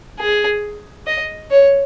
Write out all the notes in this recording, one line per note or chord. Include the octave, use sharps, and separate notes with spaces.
G#4
D#5
C#5